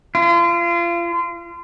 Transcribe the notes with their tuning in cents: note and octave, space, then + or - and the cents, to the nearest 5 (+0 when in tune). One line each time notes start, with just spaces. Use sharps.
F4 -35